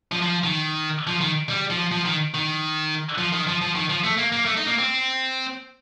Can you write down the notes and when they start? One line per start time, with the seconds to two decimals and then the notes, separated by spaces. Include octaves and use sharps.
0.12 F3
0.22 F3
0.44 D#3
1.07 F3
1.21 D#3
1.49 G3
1.70 F3
1.92 F3
2.05 D#3
2.34 D#3
3.18 F3
3.32 D#3
3.47 F3
3.61 F3
3.75 D#3
3.89 F3
4.04 A3
4.17 A#3
4.32 A#3
4.46 A3
4.57 D#4
4.67 A#3
4.78 C4